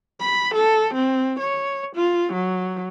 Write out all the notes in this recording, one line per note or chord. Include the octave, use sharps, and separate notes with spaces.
B5
A4
C4
C#5
F4
F#3